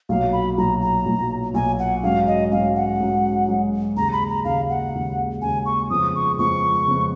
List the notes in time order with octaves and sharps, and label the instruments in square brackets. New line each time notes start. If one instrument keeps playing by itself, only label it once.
[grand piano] B1 A#2 F#3 [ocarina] F5
[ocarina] B5
[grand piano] B1 A#2 F#3 [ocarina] A#5
[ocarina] A#5
[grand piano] B1 A#2 F#3
[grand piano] B1 A#2 F#3 [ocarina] G#5
[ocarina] F#5
[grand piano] G#2 F#3 C#4 [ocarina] F5
[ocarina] D#5
[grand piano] G#2 F#3 C#4 [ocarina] F5
[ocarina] F#5
[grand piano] G#2 F#3 C#4
G#2 F#3 C#4
[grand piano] D#2 C#3 G#3 [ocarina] A#5
[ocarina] B5
A#5
[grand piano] D#2 C#3 G#3 [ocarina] F5
[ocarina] F#5
[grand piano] D#2 C#3 G#3
[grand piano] D#2 C#3 G#3 [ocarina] G#5
[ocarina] C#6
[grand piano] F2 C#3 F3 G#3 B3 [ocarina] D#6
[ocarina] C#6
[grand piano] F2 C#3 F3 G#3 B3 [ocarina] C#6
[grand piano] F2 C#3 F3 G#3 B3